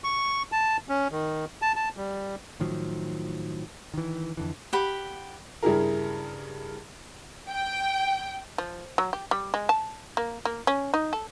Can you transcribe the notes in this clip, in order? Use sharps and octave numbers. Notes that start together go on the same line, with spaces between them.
C#6
A5
C#4
D#3
A5
A5
G3
A2 D#3 F3 F#3
D#3 E3
F2 D3 E3
G4 F#5 B5
G2 C#3 E4 G4 G#4 A#4
G5
F3
F#3
G4
G3
G#3
A5
A#3
A#3
C#4
D#4
A4